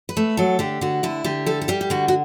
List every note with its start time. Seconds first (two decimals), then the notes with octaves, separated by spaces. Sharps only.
0.09 B4
0.17 A3
0.37 F#3 A4
0.59 D3 G4
0.81 D3 F#4
1.03 D3 E4
1.24 D3 G4
1.46 G3 A4
1.62 A4
1.68 G3 G4
1.81 G4
1.90 D3 F#4
2.08 F#4